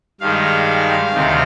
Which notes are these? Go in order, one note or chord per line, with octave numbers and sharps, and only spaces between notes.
G2 D#3 G#3 F5
D2 C3 D#3